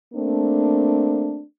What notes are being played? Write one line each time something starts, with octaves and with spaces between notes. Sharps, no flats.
A3 A#3 C4 D4